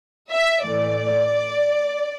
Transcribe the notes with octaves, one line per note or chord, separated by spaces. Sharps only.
E5
A2 E3 A3 D5